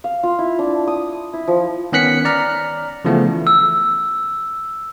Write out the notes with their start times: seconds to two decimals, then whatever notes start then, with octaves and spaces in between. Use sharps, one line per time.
0.04 F5
0.23 F4
0.39 E4
0.59 D4
0.87 D#6
1.33 E4
1.47 F3
1.92 D#3 B3 C#4 F#6 B6 C#7
2.25 D5 A#5 F6
3.05 C#3 E3 F3 A3 B3
3.47 E6